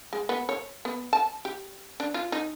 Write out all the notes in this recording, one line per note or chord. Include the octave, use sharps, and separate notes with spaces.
G#3
B3
C#5
B3
A5
G4
D4
F4
D#4